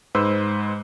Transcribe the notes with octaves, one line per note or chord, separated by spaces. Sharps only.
G#2 B4 C5 E6